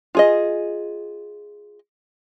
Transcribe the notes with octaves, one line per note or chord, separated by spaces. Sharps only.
F4 G#4 D#5